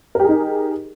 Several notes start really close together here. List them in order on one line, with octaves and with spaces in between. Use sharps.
A#4 G4 G#4 D#4